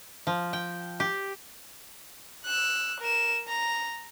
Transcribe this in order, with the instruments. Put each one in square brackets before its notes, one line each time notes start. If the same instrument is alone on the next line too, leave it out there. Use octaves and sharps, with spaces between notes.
[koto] F3
G5
G4
[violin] E6 F#6
A#4 E7
A#5